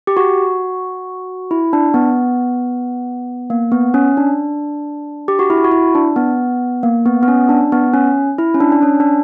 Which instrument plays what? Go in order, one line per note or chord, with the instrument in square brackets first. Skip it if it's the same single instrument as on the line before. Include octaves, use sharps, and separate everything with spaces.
[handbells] G4
F#4
E4
D4
B3
A#3
B3
C#4
D4
G4
F#4
E4
F#4
E4
D4
B3
A#3
B3
B3
C#4
D4
B3
C#4
E4
C#4
D4
D4
C#4
D4